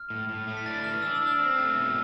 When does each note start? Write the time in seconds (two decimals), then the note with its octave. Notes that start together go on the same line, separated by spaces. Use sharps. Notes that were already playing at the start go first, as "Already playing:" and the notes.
Already playing: F6
0.10 A2
0.29 A2
0.47 A3
0.57 B6
0.66 D4 A6
0.84 E3 F6
1.02 D4 E6
1.15 E6
1.21 D4
1.27 F6
1.39 C4
1.59 A3
1.77 B2